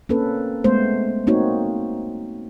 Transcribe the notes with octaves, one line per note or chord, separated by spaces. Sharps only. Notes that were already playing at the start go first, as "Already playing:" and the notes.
A#3 C4 C#4 A4 B4
G#3 A3 B3 C5
A#3 C4 D#4 F#4 C#5